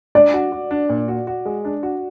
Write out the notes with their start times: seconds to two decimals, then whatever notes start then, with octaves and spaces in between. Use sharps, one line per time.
0.15 D4 D5
0.34 F#4
0.52 F#4
0.71 D4
0.89 A#2
1.08 F#4
1.27 F#4
1.45 G#3
1.65 D4
1.83 F#4